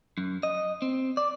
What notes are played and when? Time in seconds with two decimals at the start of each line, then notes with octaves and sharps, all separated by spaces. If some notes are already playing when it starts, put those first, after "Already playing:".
0.18 F#2
0.43 D#5
0.82 C4
1.17 D5